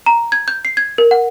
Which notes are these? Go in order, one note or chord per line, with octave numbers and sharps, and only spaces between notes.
A#5
G#6
G6
C7
G#6
A#4
F#5